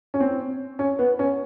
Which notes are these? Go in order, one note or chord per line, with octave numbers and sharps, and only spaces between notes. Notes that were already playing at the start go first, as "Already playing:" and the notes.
C#4
C4
C#4
B3
C#4